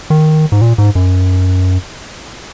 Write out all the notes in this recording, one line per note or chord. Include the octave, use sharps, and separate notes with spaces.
D#3
G#2
A#2
G#2
F#2